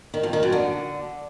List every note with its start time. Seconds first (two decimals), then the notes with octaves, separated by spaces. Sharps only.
0.14 D#3
0.23 F2
0.33 D#3
0.43 F#2
0.52 D3